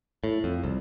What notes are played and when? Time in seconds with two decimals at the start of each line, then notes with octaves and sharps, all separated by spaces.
0.24 A2
0.44 F2
0.64 C2